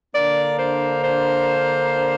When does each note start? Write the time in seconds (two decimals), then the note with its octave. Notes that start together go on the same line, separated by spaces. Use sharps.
0.14 D3 A#3 D4 D5
0.59 C5
1.03 C5